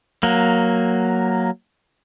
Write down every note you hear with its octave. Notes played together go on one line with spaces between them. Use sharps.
F#3 A#3